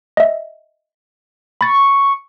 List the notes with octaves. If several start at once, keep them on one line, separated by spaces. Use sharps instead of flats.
D#5 E5
B5 C#6 A6